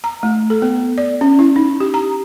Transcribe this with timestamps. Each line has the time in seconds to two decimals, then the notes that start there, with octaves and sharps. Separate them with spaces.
0.04 A#5
0.23 A3
0.50 A4
0.62 B3
0.98 D5
1.21 C#4
1.39 E4
1.56 D#4
1.80 G4
1.94 A#5